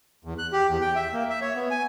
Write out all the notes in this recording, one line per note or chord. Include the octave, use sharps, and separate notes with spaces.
E2
F#6
G4
E2
G5
E5
A#3
E5
C#5
B3
G#5